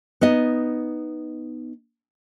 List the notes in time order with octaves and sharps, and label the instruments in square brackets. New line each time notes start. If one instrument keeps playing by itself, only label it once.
[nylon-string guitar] B3 D#4 D#5